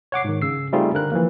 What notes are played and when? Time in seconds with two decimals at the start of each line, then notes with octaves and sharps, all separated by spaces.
0.12 C#5 F#5 D6 C7
0.24 G#2 D#3
0.42 C#3 E6 C7
0.73 G3 A3 C4 D#4 F4 G#4
0.94 D3 A#4 F#6
1.12 E3 F3 A#3